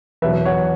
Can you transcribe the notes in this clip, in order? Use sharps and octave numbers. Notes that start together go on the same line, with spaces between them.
E2 B2 F#3 B3 B4 E5
C#5 F#5